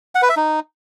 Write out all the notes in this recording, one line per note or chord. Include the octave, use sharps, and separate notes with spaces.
F#5
B4
E5
D#4